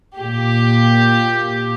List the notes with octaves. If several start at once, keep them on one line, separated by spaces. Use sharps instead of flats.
A#2 G4